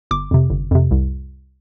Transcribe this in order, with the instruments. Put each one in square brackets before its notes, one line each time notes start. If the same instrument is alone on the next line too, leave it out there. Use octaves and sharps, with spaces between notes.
[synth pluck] G1 D6
F2 C3
G1
F2 C3
C2